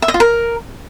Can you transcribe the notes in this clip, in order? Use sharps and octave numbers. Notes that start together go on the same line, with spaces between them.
E5
D#5
F4
A#4